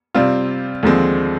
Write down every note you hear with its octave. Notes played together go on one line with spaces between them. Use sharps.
C3 G3 C4 F4
D#2 D3 F3 G#3 C4